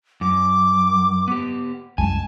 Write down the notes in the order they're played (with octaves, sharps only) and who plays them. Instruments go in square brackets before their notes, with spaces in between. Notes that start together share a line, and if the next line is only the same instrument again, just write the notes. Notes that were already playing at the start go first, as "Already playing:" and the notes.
[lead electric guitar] F#2 [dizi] D6
[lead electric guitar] B3 G4
[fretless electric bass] C2 F#2 G#3 [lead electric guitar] G#5 [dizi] A5